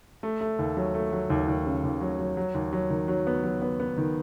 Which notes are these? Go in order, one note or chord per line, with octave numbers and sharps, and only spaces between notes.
A3
A3
D#2
F#3
A3
F#3
D#2
D#2
C#3
D#2
F#3
F#3
F#3
D#2
F#3
D#3
F#3
B3
F#3
B3
B3
D#3